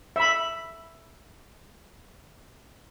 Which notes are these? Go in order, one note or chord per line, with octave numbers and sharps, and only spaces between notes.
E5 B5